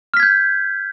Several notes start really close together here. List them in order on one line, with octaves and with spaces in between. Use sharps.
F6 B6 G#6 G6